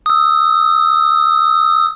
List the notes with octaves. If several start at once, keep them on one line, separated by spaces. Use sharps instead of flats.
D#6 E6